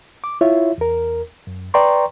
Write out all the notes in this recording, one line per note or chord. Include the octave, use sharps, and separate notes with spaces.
D6
E4 F4 C#5 E5
E2 A#4
F#2
B4 D5 G5 A#5 C6 C#6